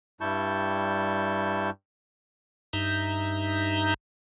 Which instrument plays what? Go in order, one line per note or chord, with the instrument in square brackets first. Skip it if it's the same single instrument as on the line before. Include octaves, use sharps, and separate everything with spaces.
[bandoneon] G2 G3 E4 A5 C#6 G6
[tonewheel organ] G2 D#4 E5 A#5 G6